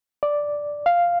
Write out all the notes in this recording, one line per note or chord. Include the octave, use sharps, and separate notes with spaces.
D5
F5